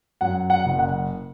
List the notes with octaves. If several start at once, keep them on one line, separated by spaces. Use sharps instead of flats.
F#2 F#5
F#5
F#1
F#5